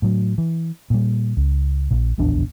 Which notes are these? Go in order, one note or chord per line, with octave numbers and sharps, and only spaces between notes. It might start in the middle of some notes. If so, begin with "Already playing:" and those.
A2 F#3
E3
A#2 G3
C#2
A#1 A#2
D1 A#1 E2 D4